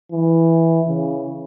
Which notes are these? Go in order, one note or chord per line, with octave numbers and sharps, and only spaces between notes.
E3
C#3